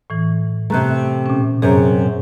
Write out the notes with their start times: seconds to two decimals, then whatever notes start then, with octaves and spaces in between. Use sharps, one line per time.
0.10 A2 E3
0.70 C3 A3 A#5 F#6
1.26 A#2 C#4
1.62 F#2 C3 G#4 A#5